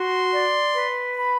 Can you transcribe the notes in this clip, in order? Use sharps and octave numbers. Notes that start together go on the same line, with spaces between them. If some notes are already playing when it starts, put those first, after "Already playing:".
Already playing: F#4 C6
D5
B4
B5